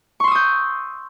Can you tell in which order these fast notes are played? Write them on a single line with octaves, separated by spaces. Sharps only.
C#6 C6 E6 D#6 G6